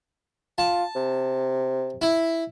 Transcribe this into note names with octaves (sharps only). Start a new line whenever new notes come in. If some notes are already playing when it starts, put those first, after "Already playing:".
F4 A5
C3
E4